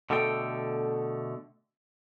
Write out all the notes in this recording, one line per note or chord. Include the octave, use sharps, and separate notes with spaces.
B2 D3 A3 A4 G5